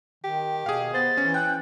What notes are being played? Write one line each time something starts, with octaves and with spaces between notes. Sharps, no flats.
D#3 G4
B2 G#4 F5
B3 C5 A6
E3 C#4
G5 F#6